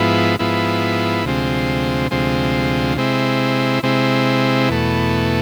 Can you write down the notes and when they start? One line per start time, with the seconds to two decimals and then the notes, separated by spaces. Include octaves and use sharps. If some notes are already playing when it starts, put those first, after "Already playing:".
Already playing: G#2 F3 B3 E4
0.39 G#2 F3 B3 E4
1.25 D2 C3 F3 G#3 C4
2.11 D2 C3 F3 G#3 C4
2.97 C3 G#3 C4 E4
3.83 C3 G#3 C4 E4
4.69 E2 B2 A3